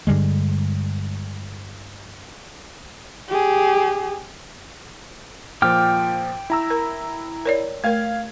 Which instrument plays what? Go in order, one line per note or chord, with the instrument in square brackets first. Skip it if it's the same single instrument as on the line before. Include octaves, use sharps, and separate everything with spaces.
[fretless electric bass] G2 D3 G3 G#3
[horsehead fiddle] G4 G#4
[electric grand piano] A#2 F3 [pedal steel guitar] G5 D6 F6
[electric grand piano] E4 A#5 E6
[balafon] A#4
A#4 C#5 D5
[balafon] A3 A#4 [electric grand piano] F5 G#6